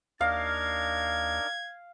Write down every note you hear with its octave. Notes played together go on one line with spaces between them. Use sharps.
D#2 D4 D#4 A#4 F5 G#6